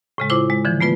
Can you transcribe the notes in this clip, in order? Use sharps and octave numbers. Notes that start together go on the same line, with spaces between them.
A2 C#3 G#3
E4 F4 C5 D6
G#3
D3 E3 F3
A3 B3 F4 B4